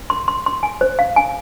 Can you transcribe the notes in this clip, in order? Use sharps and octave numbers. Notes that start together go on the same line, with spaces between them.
C6
C6
C6
G#5
C5
F5
G#5